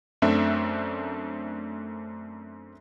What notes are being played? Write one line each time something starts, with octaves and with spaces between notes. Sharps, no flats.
F#2 A3 C4 D4 E5